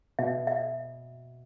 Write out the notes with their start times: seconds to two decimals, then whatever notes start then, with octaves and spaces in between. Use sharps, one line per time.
0.19 B2 E5
0.47 E5